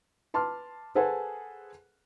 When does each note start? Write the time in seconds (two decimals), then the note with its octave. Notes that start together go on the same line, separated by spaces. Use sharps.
0.34 B4 A5 C6 D6 F6
0.95 G#4 A4 B4 C5 F#5 G#5